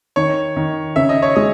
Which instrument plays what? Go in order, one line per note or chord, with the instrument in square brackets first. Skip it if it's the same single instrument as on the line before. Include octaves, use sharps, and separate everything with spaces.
[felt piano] D#3 [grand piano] C#5
[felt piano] D#3
[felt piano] C#3 [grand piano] E5
[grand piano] D#5
C#5
[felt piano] G#3 [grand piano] D#5